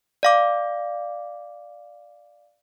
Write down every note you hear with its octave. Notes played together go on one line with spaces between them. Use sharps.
D5 F5 D6